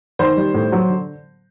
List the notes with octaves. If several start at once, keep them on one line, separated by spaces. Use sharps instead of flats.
D#3 C5
G3
A2
F#3
D3